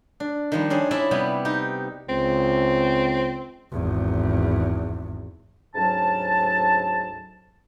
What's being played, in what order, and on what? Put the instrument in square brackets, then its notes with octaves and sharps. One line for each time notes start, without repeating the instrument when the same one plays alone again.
[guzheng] D4
D#3 F3 G3
C#4 D4 G#4
C#4 E4 D5 E5
C3 G3 B3 E4
D#4 G4
[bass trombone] C#2 [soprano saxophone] C4
[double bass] G#1 E2
[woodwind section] D2 G#2 F#3 C#4 A5